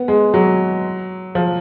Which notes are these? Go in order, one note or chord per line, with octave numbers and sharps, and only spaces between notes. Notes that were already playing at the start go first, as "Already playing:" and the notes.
Already playing: B3
G#3
F#3
F3